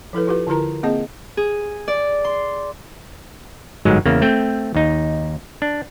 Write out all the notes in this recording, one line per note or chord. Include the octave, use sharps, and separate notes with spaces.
F3 E4 A4 B4
F4 G4 B4
D3 E4 F4 A#4 A#5
A#3 C4 G#4 D#5 A5
G#4
D5
C6
G1 G#2 F#3 G#3
E2 C#3 A#3
A3 C4 G5
D#2 D#4
D4